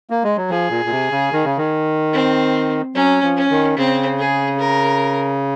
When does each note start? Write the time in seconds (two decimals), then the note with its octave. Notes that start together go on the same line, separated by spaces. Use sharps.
0.10 A#3
0.24 G#3
0.37 F#3
0.50 F3 G#4
0.70 A#2
0.85 A#2
0.90 C3
1.11 C#3
1.32 D#3
1.45 C#3
1.57 D#3
2.13 C4
2.95 F#3 C#4
3.23 F3
3.37 C#4
3.51 D#3
3.77 C#3 C4
4.19 G#4
4.59 A#4